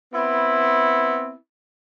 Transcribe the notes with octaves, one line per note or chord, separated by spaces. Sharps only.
B3 C4 E4